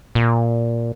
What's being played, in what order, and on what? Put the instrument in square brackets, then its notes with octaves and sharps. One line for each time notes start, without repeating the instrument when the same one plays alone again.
[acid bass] A#2